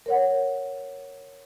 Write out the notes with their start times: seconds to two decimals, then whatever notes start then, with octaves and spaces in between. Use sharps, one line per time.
0.06 A#4 C#5 F#5